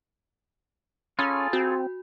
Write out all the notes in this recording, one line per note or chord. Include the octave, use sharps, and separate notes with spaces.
C#4 F4 G#4 A4 B5
C4 F#4